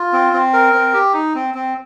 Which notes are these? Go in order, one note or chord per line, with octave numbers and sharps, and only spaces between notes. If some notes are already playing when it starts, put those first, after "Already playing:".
Already playing: F4
C4
C4
A#4
C4
G4
D#4
C4
C4